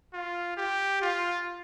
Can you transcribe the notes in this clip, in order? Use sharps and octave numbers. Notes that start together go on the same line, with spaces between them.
F4
G4
F4